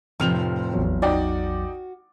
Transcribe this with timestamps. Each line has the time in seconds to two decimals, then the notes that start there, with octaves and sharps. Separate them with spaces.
0.20 F1 A2 C3 F3 F6 F7
0.74 A1 E2 F#3
1.02 D#4 F#4 D5 G5